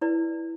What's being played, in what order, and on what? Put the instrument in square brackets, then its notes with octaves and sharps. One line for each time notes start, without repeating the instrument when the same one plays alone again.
[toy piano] E4 B4 D5